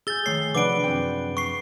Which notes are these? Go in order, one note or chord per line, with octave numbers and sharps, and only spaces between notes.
G#4 E6 G6 A6 G7
D#3 A3 C#5 C7
C3 F3 D4 B4 D5 F#5 D6 D7
F#2 C4 G5
C#6 C7